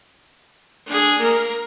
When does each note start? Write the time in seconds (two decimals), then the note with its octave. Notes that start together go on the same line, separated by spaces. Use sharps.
0.87 D4 G#4
1.19 A#3 A#4